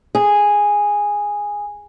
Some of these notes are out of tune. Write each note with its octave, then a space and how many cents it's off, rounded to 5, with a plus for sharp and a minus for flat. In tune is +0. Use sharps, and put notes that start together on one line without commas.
G#4 -10